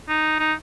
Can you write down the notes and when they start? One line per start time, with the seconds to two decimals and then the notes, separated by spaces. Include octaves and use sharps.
0.09 D#4
0.39 D#4